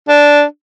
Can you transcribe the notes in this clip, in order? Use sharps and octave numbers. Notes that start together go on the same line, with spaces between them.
D4